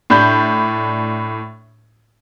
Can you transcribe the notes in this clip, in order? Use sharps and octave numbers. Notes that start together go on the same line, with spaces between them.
A2 D4 B5 G6